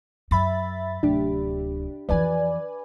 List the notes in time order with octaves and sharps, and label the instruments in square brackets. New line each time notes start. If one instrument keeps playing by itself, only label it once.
[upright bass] F#2 [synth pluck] E5 B5 A6
[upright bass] D1 C3 [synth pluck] D4 G4
[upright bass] F2 E3 [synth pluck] B4 D5 G#5